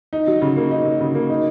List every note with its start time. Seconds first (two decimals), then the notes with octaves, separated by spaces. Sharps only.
0.13 D#4
0.27 F#3
0.42 C#3
0.56 A#3
0.71 D#4
0.85 F#3
1.01 C#3
1.15 A#3
1.30 D#4